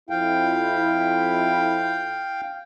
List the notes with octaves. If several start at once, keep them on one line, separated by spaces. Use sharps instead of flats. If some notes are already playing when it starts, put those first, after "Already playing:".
F2 E4 F5 G5